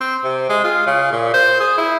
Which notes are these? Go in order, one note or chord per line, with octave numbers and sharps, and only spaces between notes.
C4
C3
G#3
F4
C#3
A#2
C5
G#4
E4